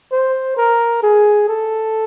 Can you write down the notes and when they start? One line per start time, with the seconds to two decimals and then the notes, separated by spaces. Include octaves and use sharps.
0.12 C5
0.57 A#4
1.03 G#4
1.48 A4